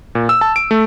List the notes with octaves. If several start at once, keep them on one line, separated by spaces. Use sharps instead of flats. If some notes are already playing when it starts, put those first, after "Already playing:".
A#2
E6
A5
D7
A3